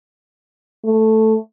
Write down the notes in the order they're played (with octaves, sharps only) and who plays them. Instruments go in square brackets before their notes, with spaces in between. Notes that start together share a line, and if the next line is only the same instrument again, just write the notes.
[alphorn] A3